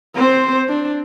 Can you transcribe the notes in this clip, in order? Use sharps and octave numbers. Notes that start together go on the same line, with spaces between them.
C4 C5
D4